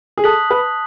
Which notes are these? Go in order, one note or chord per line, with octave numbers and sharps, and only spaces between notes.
G#4
A4 A5 D#6 F#6 B6 F#7
B4